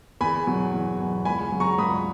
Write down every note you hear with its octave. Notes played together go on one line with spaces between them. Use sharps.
E2 G#5 B5
B2 F#3
E2
B2 F#3
C#2 G#5 B5
C#3 F#3
A#5 C#6
C#2 B5 D#6